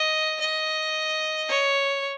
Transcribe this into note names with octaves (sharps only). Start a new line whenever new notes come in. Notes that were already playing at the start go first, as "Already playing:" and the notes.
Already playing: D#5
D#5
C#5